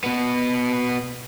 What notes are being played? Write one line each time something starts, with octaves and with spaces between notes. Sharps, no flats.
B2 B3